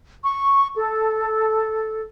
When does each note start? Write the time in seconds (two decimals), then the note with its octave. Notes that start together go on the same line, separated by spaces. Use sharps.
0.23 C#6
0.76 A4